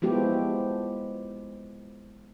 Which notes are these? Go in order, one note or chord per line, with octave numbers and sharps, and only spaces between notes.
F3 G#3 B3 E4 F#4 G4